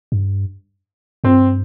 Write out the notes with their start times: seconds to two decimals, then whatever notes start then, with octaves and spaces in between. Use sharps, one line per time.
0.12 G2
1.24 G2 C4